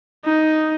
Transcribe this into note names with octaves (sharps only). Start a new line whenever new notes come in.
D#4